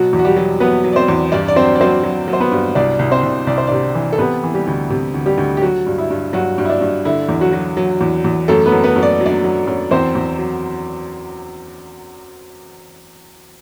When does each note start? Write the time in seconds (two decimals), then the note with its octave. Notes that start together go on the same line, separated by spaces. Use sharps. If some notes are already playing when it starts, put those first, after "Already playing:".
Already playing: B2 F#3 F#4
0.13 E2
0.19 F#4
0.25 G3 G4
0.36 F#3
0.60 F#3 B3 B4
0.84 F#3
0.93 D5
0.96 C4 C5
1.08 E2
1.32 G2 D4 D5
1.48 D5
1.56 F#3 C4 C5
1.75 D5
1.81 F#3 C4 C5
2.03 F#3
2.28 F#3
2.33 C5
2.40 B3 B4
2.52 G2
2.75 C2 D4 D5
2.99 C2
3.11 C4 C5
3.23 C2
3.47 C2 D5
3.58 C5
3.67 C3 D4 D5
3.95 E3
4.13 A4
4.18 C3 B3 B4
4.43 E3
4.54 G3 G4
4.67 D2
4.90 C3
5.14 D2
5.26 G3 G4
5.38 D2
5.57 G4
5.62 F#3 F#4
5.86 G2
5.98 E4
6.10 G2
6.33 G2 F#3 F#4
6.58 G2
6.65 E4
6.70 D4
6.81 G2
7.05 D3 E4
7.29 E2
7.41 F#3 F#4
7.53 F#3
7.77 F#3
8.01 E2
8.24 E2
8.48 F#2 A3 A4
8.66 B3 B4
8.72 F#2
8.84 B3 B4
8.96 F#2
9.03 D5
9.21 F#3
9.26 D4 D5
9.44 F#3
9.67 F#2
9.91 E2 C4 C5
10.15 E2
10.39 F#3